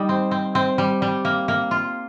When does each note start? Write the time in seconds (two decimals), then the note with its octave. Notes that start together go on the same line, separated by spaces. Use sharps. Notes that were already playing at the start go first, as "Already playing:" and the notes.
Already playing: G3 D#4
0.09 C4
0.31 C4
0.55 C4
0.78 G3
1.02 G3
1.25 A#3
1.48 A#3
1.71 F4